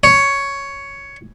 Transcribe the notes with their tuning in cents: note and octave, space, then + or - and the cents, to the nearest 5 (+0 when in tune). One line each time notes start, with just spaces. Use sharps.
C#5 +5